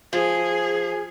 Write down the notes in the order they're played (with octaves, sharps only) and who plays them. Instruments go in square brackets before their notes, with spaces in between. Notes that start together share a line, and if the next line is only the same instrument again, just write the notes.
[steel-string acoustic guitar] F3 [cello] G#4